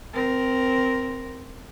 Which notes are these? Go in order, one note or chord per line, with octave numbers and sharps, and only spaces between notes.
C4 A#4